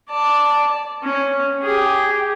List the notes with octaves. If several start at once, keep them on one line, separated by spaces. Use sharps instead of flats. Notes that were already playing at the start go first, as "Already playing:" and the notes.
D5 A5
C#4
G4 G#4